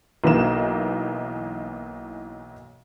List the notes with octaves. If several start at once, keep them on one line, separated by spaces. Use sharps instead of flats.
B1 E3 A#3 D#4 A#4 E7